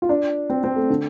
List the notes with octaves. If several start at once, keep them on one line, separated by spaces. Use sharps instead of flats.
F4
D4
C4
C4
A3
D3